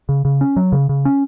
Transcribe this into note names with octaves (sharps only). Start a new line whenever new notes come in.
C#3
C#3
C#4
F#3
C#3
C#3
C#4